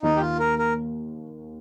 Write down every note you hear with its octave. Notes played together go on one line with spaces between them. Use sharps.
D#2 D#3 A#3 D#4
G4
F4
A#4
A#4